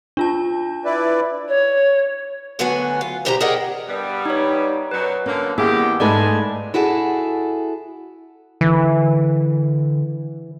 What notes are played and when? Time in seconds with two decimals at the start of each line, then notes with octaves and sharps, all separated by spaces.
0.17 D4 F4 A5
0.85 E4 B4 D5
1.48 C#5
2.59 D2 D3 F#3 B3 F#4 G#5
3.01 F4
3.25 E2 B2 G4 C5 E5 A#5
3.41 G#4 A#4 D5 D#5 F#5 G5
3.88 G2 G3 B3
4.26 D#4 C#5
4.91 F#2 B2 F#3 B4
5.26 D3 A#3 C#4
5.58 D#3 A#3 B3 E4 G4 G#4
6.00 G#2 G#3 A3 B4 D5 G#5
6.74 E4 F#4 G#4 A4
8.61 D3 E3